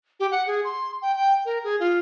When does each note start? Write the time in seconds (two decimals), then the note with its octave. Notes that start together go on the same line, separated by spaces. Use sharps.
0.20 G4
0.31 F#5
0.47 G#4
0.64 C6
1.02 G5
1.16 G5
1.45 A#4
1.64 G#4
1.80 F4